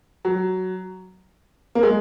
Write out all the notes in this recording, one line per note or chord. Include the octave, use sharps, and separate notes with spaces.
F#3
A#3
G#3